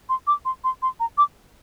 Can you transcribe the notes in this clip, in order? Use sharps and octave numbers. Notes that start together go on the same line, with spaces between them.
C6
D6
C6
C6
C6
A#5
D6